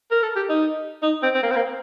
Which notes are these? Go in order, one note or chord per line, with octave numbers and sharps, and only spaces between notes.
A#4
A4
G4
D#4
D#4
C4
C4
A#3
C4
A#3